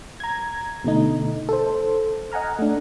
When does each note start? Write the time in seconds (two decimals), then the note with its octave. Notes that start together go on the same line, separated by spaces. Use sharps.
0.20 A#5 G#6
0.84 B2 D3 A3 D#4
1.49 A4 C5
2.32 D#5 F#5 G#5 A#5 F6
2.59 A3 D4